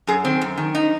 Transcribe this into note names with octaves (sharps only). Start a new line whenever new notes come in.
F#2 G#4
D#3 C4
F#2
D#3
D#4